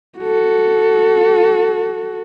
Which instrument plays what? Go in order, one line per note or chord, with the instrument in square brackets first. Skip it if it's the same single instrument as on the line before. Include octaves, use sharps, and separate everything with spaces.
[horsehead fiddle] F#4 A4